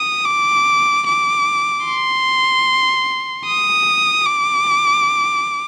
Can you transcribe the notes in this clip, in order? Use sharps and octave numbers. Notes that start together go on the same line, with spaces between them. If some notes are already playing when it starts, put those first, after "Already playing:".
Already playing: D#6
D6
D6
C6
D#6
D6